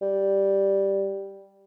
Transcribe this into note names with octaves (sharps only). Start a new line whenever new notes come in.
G3